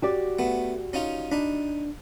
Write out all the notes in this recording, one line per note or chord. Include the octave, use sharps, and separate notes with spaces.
F#4 G4 D5
A3 B3
C#4 D#4 F4
D4 D#4 B5